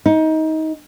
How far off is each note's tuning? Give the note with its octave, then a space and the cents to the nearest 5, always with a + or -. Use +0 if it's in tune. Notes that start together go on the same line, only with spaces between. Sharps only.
D#4 +25